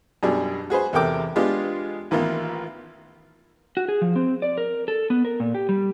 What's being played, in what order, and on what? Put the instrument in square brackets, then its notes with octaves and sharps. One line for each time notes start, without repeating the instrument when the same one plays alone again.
[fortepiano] F#2 B2 G3 D4 G#4
F#4 G#4 B4 C5
E2 C3 A4 A#4 G5 D6
G#3 B3 D4 F4 G4
A1 D#3 E3 A#3 B3 F4
[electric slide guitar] F#4
G#4
F3
C4
D5
A#4
A4
B3
A#4
A#2
G4
G3